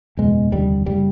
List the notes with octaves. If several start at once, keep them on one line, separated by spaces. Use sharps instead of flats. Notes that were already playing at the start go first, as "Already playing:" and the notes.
F#1 E2 B2 G#3
F1 D#2 D3 G3
F#1 C#3 G3